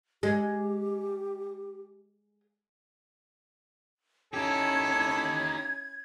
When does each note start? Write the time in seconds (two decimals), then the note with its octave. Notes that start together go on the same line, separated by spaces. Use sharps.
0.23 G#3 G4
4.34 C#4 D#4 E4 G4 A4 G#6